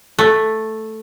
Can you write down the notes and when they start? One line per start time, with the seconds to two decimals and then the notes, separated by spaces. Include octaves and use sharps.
0.19 A3